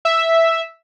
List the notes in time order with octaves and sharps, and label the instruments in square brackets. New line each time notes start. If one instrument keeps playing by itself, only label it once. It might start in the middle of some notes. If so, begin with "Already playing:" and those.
[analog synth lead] E5